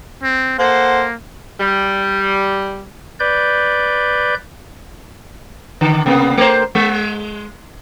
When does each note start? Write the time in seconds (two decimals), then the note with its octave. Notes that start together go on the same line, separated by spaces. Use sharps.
0.23 C4
0.59 A#3 A4 C5 F#5
1.59 G3
3.20 B4 D5 G6
5.81 D3
6.06 C3 A#3 B3
6.38 A3 A#4 C5
6.75 G#3